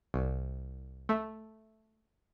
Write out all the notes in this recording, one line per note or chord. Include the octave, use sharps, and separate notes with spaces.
C2
A3